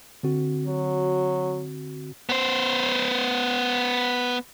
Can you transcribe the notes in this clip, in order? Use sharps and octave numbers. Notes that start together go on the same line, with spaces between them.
D3 C4 F#4
F#3
B3 C5